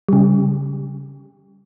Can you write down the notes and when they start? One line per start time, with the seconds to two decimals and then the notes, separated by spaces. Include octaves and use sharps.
0.09 C#3 G3